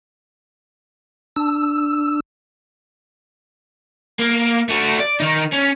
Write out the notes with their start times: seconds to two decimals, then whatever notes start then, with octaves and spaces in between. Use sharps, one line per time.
1.36 D4 E6
4.19 A#3
4.69 A3 F#4
5.00 D5
5.20 D#3 D#4
5.53 C#4